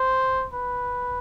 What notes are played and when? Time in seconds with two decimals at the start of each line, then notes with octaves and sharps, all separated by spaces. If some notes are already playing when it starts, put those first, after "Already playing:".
Already playing: C5
0.53 B4